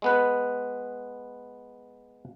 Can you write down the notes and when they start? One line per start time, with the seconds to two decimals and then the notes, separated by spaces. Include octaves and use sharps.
0.02 G#3 B3 B4